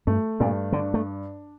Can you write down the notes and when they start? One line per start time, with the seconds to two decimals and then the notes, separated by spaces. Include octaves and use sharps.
0.07 G2 A3
0.40 G2 A#2
0.72 D3 D4
0.94 A3